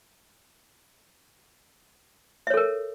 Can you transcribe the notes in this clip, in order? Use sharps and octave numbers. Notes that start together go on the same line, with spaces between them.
A4 A#4 C#5 E5